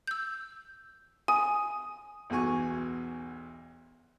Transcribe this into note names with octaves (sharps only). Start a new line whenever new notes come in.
E6 G6
G#5 D#6
B1 E2 F#4 G#5 C#6